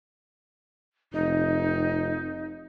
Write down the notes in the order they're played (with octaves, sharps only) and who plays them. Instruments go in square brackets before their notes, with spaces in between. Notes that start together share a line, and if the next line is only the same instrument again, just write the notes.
[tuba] F1 [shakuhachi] D#4